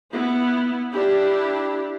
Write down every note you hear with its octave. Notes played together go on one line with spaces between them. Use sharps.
B3 E4
D4 E4 G4